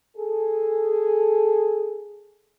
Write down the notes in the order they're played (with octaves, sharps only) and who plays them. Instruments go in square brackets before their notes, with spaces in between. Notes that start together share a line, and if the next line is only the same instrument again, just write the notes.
[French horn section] G#4 A4